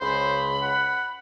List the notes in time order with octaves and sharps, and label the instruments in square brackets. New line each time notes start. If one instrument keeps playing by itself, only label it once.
[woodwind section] C#2 C#3 [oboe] C5 [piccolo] B5
[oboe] F#5